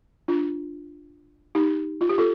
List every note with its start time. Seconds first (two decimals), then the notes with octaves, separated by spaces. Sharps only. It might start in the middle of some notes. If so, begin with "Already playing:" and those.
0.28 D4 F4
1.55 D#4 G4
2.01 F4
2.09 G4
2.18 F4 A4